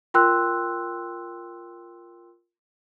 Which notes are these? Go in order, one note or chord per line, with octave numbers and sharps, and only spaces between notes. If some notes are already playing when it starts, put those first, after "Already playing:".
F4 A#4 G5 C6 E6 F#6